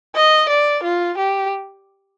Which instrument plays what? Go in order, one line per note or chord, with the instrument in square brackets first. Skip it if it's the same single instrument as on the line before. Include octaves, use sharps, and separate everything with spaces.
[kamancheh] D#5
D5
F4
G4